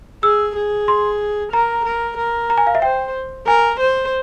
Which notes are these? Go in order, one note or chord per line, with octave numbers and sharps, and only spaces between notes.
G#4 E6
G#4
C6
A#4 A#5
A#4
A#4
A#5
G#5
F5
E5
C5 G5
A#4 G#5
C5